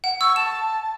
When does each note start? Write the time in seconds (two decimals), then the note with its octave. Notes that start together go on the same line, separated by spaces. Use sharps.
0.04 F#5
0.21 C#6 E6
0.36 A5 E7